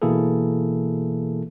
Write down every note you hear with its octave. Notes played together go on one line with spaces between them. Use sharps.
B2 E3 A#3 E4 G#4 A4